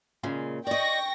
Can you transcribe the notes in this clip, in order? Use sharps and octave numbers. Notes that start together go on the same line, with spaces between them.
A#2 C#3 G#3
D5 D#5 G5 C#6 A#6